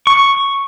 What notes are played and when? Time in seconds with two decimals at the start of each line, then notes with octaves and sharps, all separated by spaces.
0.07 C#6